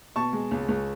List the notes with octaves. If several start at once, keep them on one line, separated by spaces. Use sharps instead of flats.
B2 A5 C#6
G#3
C#2
C#2